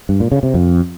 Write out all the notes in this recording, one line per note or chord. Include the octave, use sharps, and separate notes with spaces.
G2
A#2
C#3
C3
F2